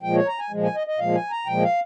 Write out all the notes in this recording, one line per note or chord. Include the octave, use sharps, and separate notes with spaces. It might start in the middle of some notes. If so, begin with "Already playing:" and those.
A#2 F3 G#3 G5
C#5
A#5
G#5
A#2 F3 G#3
G#5
D#5
D#5
A#2 F3 G#3 F5
G#5
A#5
A#2 F3 G#3 G5
F5